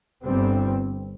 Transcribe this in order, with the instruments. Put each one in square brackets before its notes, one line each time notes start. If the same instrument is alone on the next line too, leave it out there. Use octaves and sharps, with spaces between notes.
[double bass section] G1 G2 G3 C4